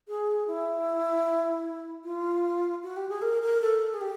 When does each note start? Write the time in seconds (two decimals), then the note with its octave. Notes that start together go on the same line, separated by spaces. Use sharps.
0.08 G#4
0.48 E4
2.04 F4
2.83 F#4
2.96 G4
3.09 G#4
3.22 A#4
3.42 A#4
3.62 A4
3.94 G#4
4.01 G4